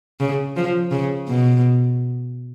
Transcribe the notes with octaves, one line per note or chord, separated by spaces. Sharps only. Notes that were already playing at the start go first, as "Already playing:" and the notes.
C#3
F3
C#3
B2